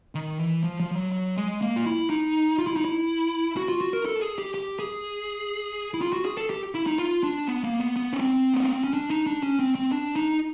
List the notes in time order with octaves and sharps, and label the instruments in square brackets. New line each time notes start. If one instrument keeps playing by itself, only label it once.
[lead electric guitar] D#3
E3
F3
F3
F3
F#3
F#3
G#3
A#3
F4
E4
D#4
F4
E4
D#4
E4
F#4
F4
F#4
A#4
A4
G#4
G4
G4
G#4
E4
F4
F#4
G#4
A4
G4
E4
D#4
F4
D4
B3
A#3
B3
B3
C#4
C4
A#3
B3
C4
C#4
D4
D#4
D4
C#4
C4
C4
D4
D#4